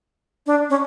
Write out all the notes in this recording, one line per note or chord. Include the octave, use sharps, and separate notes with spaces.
D4
C#4